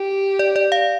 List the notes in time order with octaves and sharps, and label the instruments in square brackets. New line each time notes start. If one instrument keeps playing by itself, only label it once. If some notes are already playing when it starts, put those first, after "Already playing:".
Already playing: [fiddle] G4
[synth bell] D5
D5
F5